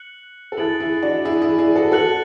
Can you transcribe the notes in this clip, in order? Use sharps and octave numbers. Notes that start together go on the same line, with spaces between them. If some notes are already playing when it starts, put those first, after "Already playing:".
Already playing: F#6 C#7 F#7
A4
E4 G#4 F#6 A6 D7 F#7
E4 G#4
D4 F#4
E4 G#4
E4 G#4
E4 G#4
F#4 A4
F#4 A4 F#6 C#7 F#7